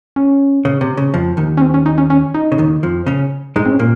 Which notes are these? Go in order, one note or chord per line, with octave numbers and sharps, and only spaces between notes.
C#4
C#3
C3
C#3
F2 F3
D#2 D#3
C#4
C4
C#4
D#4
C#4
C#4
D#4
C#3
D#2 D#3
F2 F3
C#3 C#4
G#2 G#3 D#4
C4
C#4
A#2 A#3